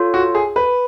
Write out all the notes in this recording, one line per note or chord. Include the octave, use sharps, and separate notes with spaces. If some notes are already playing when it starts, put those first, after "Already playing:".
Already playing: F4 A4 C#5
F#4
G#4
B4